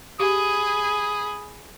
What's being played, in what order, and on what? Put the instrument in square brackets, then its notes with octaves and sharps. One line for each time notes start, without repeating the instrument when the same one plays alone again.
[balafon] G4 [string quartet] G#4 B5 [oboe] D#6